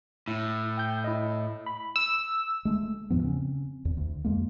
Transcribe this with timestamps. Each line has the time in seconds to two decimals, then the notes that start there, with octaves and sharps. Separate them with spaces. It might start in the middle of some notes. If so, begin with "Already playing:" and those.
0.27 A2 E4
0.77 G5 G6
1.04 E4 D#5
1.66 B5
1.96 E6
2.65 G#3 A3
3.10 E2 A2 F3 B3
3.23 C#3 C4 C#4
3.85 E2
3.97 D2
4.24 F2 G#3 A#3